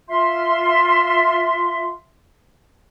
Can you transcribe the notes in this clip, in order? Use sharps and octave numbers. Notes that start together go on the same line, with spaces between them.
F4 E5 C6